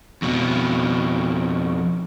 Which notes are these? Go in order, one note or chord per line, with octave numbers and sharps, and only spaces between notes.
F2 B2